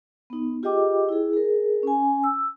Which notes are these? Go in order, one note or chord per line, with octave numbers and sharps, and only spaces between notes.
B3 D#4
F4 G4 G#4 D#5 G5 D6
E4 G#4
G#4 A#4
C#4 G#5
E6